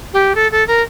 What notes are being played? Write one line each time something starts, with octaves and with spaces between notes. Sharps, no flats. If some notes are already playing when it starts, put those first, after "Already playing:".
G4
A4
A4
A#4